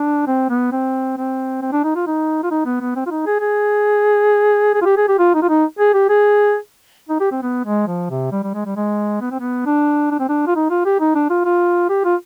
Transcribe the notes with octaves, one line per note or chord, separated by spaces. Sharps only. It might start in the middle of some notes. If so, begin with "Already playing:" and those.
Already playing: D4
C4
B3
C4
C4
C4
D4
D#4
F4
D#4
F4
D#4
B3
B3
C4
F4
D#4
G#4
G#4
G#4
F4
G4
G#4
G4
F4
D#4
F4
D#4
G#4
G4
G#4
D#4
G4
C4
B3
G#3
F3
C3
G3
G3
G#3
G3
G#3
B3
C4
B3
D4
D4
C4
D4
F4
D#4
F4
G4
D#4
D4
F4
F4
G4
F4